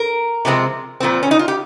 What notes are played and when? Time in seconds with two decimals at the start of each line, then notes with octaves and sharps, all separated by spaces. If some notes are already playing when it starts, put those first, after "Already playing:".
Already playing: A#4
0.45 C3 F3 G#3 C4
1.00 A#2 F3 C4
1.23 C#4
1.31 D#4
1.39 F4
1.48 G4